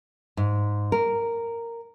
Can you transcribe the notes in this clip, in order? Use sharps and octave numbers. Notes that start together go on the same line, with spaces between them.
G#2
A#4